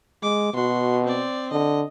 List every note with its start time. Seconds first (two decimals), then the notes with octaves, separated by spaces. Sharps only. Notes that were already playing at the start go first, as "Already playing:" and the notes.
0.23 G#3 D6
0.54 B2 F#4 C6
1.04 C4 D5
1.52 D3 D#5